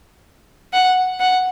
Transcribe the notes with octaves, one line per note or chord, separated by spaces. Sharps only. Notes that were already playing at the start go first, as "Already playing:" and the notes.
F#5
F#5